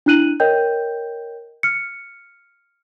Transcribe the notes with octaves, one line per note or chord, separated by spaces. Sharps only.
D4 E4 F#6 D#7 F#7
A#4 C#5 D#5 G5 G6
F6 C#7